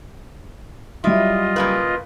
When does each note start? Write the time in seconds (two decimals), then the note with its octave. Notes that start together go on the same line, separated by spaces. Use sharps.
1.04 F#3 G3 E4 F4 D#5
1.56 C#3 A#3 B4